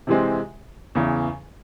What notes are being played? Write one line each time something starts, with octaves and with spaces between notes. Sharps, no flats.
C3 E3 G#3 C4
E2 C#3 E3